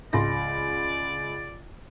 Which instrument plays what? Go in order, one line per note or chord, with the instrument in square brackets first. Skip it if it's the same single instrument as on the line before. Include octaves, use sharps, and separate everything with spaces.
[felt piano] C#2 C6 A#6 [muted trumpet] D5